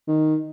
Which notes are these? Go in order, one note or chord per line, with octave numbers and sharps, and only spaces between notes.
D#3